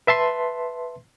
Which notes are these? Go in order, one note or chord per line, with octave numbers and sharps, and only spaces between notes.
B4 E5 A5 C6